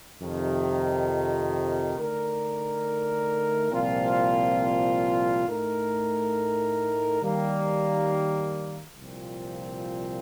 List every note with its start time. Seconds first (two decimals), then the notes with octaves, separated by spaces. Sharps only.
0.21 F2 C3 D#3
1.95 D3 A3 D#4 A#4 D5
3.71 C2 A#2 F3 C4 F4
5.46 A2 A3 D#4 A#4
7.21 D#3 G3 A#3
8.96 C2 A#2 F3 C4